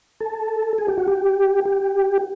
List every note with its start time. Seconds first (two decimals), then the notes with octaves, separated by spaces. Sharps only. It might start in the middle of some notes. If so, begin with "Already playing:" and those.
0.20 A4
0.78 G#4
0.88 G4
0.98 F#4
1.08 G4
1.65 G4